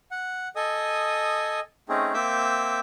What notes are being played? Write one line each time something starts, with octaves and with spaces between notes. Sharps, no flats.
F#5
A4 D#5 G#5 D#6
A3 C4 C#4 D#4 G#4
A#3 C4 E5 D6 E6 G6